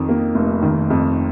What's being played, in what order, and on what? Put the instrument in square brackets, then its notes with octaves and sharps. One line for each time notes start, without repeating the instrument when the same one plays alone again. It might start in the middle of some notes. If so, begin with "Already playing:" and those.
Already playing: [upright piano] F2 D#3
A#3
F1
D#3
F2